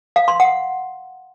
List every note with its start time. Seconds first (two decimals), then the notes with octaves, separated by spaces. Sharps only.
0.16 F5
0.28 C6
0.40 F#5